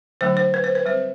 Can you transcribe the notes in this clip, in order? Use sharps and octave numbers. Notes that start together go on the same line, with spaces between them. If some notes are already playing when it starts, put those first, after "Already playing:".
D3 F#3 A3 D4 C5
C5
B4
C5
B4
G3 C4 C5